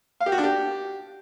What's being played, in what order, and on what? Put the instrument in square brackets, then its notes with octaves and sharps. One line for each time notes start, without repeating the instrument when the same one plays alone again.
[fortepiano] F5
G4
F#4
D4
G4